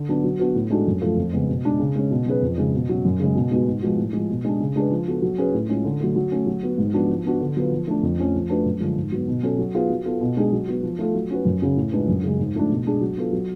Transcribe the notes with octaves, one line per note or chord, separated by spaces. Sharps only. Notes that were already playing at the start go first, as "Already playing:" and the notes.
Already playing: D3
F#3 B3 D4
F#3
B3 D4 F#4 B4
A2
G#3 D4 F#4 A4
F#2
F3 A3 F4 A4
F2
C#3 G#3 B3
B2
G#3 D4
C#3
G#3 C#4
B2
F#3 C#4 G#4 B4
F2
C#3 G#3
B2
F#3 C#4
F#2
C#3 G#3
B2
G#3 B3 F#4
G#2
F3 G#3 B3 F#4
A2
F3 G#3
B2
G#3 D4
C#3
G#3 D4 G#4 B4
F3
B3 F#4 A4
F#3
C#4 G#4 B4
A2
G#3 C#4 F4
D3
F#3 A3
F#3
A3 C#4
F#3
B3 F#4
G#2
F3 B3 D4 F#4
F3
B3 D4 F#4
D3
F#3 B3 F4 B4
F3
A3 D4
F2
F3 A3 C#4
F3
A3 D4 F#4 B4
F#2
D3 F3 G#3
G#2
F#3 B3
B2
F#3 C#4 F#4 A4
F#3
B3 F4 G#4 B4
F#3
B3 F4 A4
B2
G#3 D4 G#4
F#3
B3 F#4
F3
A3 F4 A4
F#3
C#4 F#4 B4
F#2
C#3 F#3 C#4
A2
G#3 D4 F4 B4
F#2
C#3 G#3
G#2
F3 A3 D4
B2
G#3 D4 G#4
F#3
B3 F4 A4
F#3